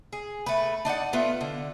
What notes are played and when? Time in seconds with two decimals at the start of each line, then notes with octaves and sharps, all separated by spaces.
0.13 G#4
0.46 A3 B4
0.85 D4 D#4 D5 F#5
1.13 A3 B3 F4
1.41 D3